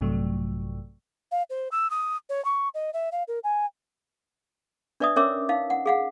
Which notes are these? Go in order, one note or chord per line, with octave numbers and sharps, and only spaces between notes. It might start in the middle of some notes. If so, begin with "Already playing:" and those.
A#1 G2 C3 F#3 A3
F5
C5
E6
D#6
C#5
C#6
D#5
E5
F5
A#4
G#5
D4 B4 D5 E5 D#6
C#4 A#4 C#5 E5 D6 E6
D#4 F5
F#5
G#4 F5 F#5